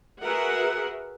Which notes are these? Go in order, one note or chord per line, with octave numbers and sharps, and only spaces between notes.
F#4 G#4 A#4 B4 E5 F#5